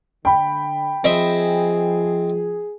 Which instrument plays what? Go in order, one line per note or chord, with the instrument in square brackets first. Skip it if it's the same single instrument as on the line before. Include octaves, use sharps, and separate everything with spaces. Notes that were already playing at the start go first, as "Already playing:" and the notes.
[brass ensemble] D3 [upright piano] G5 B5
[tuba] F3 [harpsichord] C4 D#5 E5 [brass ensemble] G#4